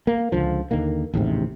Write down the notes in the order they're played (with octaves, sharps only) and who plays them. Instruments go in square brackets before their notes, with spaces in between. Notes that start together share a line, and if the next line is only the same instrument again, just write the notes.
[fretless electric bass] A#3
C#2 D3 F3
D#2 D3 D#3 A#3
A1 D#2 G#2 C3